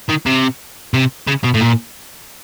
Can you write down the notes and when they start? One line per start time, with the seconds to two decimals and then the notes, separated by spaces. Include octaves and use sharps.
0.09 D#3
0.26 C3
0.94 C3
1.27 C#3
1.44 B2
1.54 A2
1.61 A#2